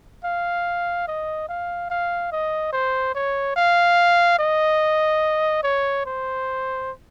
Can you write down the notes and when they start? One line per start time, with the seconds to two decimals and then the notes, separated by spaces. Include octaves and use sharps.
0.25 F5
1.08 D#5
1.49 F5
1.90 F5
2.32 D#5
2.73 C5
3.15 C#5
3.56 F5
4.39 D#5
5.63 C#5
6.06 C5